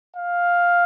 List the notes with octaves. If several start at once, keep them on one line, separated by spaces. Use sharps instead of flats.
F5